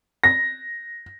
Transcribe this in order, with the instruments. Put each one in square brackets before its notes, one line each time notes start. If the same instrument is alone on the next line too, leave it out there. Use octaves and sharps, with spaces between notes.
[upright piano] A#6